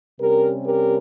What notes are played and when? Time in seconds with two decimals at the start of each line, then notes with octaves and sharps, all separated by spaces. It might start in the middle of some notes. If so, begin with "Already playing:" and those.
0.21 C3 G3 C#4 G4 A#4
0.66 G4 A#4